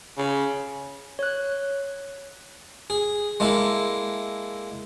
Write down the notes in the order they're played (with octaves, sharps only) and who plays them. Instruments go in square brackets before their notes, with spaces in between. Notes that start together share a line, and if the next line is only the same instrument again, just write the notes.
[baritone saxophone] C#3
[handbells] C#5 F#6
[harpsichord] G#4
G#3 A#3 E4 A4